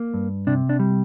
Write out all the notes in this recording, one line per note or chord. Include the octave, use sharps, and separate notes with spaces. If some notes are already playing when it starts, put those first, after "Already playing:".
Already playing: A#3
G2
C3 D4
D4
G3